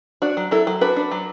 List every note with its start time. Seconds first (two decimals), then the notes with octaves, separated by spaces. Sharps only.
0.22 D4 F#4
0.37 F#3
0.51 F#3 E4 A4
0.67 F#3
0.81 D4 F#4 B4
0.96 D4
1.11 F#3